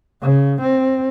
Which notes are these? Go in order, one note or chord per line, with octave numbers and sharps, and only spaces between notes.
C#3
C4